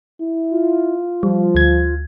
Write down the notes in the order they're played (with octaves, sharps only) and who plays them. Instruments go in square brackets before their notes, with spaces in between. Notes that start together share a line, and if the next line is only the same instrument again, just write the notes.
[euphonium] E4
[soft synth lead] F4
[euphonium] F3 [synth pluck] G3
[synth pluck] D2 G#6